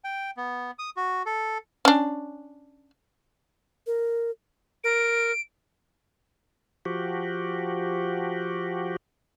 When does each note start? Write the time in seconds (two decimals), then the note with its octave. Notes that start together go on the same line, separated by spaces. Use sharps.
0.04 G5
0.37 B3
0.79 D#6
0.97 F#4
1.26 A4
1.85 C#4 D4
3.87 A#4
4.84 A#4 D7
6.85 F3 F#4 G4